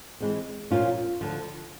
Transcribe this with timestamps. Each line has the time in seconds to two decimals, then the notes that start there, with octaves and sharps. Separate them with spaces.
0.21 E3 G#3 C4
0.71 A#2 F3 A#3 C#4 F4
1.21 D2 D3 F3